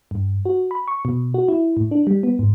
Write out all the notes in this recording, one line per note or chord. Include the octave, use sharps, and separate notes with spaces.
G2
F#4
B5
C#6
B2
F#4
E4
A2
D4
G3
B3
G#2